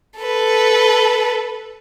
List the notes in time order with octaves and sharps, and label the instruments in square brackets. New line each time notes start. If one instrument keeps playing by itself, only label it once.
[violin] A4 B4